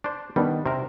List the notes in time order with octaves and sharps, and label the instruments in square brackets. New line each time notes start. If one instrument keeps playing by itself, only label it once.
[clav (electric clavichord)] D4 C5
[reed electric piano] D#3 B3 D4 [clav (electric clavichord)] G3
[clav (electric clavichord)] C3 A#4 [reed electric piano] C5